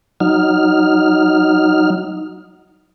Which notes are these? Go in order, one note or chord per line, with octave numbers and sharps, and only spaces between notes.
F#3 D#4 F6